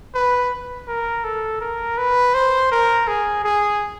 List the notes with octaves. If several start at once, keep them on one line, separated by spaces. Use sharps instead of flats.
B4
A#4
A4
A#4
B4
C5
A#4
G#4
G#4